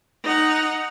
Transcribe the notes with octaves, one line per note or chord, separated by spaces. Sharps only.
D#4 F#5